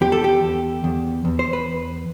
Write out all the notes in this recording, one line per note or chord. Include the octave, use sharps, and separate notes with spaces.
E2 G4
A4
G4
E2
E2
E2
C5
B4